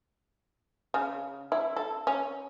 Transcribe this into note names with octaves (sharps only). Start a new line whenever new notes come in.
C#3
E4
A4
C#4